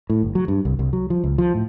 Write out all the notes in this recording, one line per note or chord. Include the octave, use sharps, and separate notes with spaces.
A2
G1
F#3
G2
C2
C2
F#3
F3
C#2
F3
A2